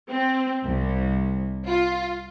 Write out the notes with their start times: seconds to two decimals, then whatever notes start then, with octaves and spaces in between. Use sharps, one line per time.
0.11 C4
0.65 C2
1.67 F4